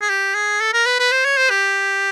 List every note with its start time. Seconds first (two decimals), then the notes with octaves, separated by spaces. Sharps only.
0.02 G#4
0.10 G4
0.35 G#4
0.61 A4
0.74 A#4
0.86 B4
1.00 B4
1.12 C5
1.25 C#5
1.37 C5
1.50 G4